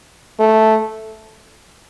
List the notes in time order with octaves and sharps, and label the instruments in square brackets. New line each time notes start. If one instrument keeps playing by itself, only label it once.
[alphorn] A3